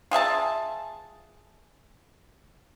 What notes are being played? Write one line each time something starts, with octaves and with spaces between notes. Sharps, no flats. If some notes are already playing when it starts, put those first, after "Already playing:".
F4 G#4 E5 A5